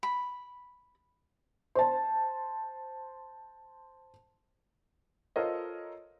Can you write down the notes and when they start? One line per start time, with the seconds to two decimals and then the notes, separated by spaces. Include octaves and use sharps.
0.03 B5
1.75 C5 A5
5.36 F4 A4 A#4 C5 C#5 D#5